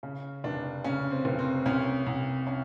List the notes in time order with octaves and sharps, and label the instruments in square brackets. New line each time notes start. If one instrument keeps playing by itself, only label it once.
[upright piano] C#3 C#4
F1 D4
C#3 C#4
C4
F1
C4
C2 C#4
C2
C#4